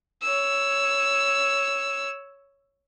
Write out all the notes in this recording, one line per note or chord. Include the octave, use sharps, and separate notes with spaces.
C#5 E6